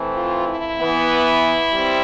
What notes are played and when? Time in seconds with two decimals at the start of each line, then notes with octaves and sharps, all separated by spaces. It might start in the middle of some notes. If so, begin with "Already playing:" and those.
Already playing: E3 A3 C4
0.16 F4
0.48 E4
0.78 E3 B3
1.73 G3 C4